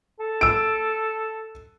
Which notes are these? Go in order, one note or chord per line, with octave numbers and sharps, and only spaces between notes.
A4
E6 D7